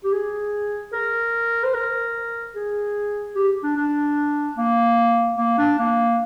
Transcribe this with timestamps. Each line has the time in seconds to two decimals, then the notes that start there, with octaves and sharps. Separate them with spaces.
0.04 G4
0.13 G#4
0.93 A#4
1.64 C5
1.74 A#4
2.55 G#4
3.35 G4
3.63 D4
3.77 D4
4.58 A#3
5.38 A#3
5.58 D4
5.79 A#3